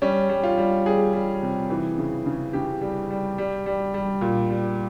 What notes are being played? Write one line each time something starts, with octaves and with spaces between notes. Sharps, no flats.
G3 C#4
G3
F4
G3
G3 G#4
G3
C3
E3
C#3
C#3
C#3 G4
G3
G3
G3
G3
G3
A#2
G3